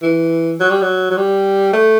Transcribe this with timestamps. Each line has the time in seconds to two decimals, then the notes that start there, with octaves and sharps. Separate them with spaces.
0.03 E3
0.60 F#3
0.71 G3
0.82 F#3
1.11 F#3
1.17 G3
1.73 A3